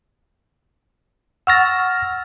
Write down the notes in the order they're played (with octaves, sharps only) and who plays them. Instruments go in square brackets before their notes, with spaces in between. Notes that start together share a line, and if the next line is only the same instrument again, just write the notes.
[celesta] F#5 C#6 A6 [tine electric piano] E6 F6 A#6